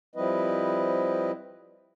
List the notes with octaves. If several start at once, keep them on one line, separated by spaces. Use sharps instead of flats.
F3 G3 C4 E4 B4 D#5